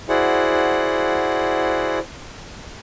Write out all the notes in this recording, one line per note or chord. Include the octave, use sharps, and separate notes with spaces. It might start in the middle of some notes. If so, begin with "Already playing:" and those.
E4 F#4 G#4 C5 D5 F#5